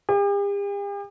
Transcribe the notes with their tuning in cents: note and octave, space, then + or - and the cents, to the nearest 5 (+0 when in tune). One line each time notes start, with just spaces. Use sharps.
G4 +45